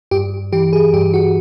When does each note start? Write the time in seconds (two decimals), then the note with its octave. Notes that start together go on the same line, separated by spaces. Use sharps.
0.11 G2 G4
0.52 E3 G4
0.73 G#4
0.93 G2 G4
1.14 F#4